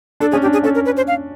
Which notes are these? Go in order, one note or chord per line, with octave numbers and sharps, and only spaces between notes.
D4 A4
C#4 G#4
G4
D4
G#4
C#4 A4
A#4
B4
C5
F5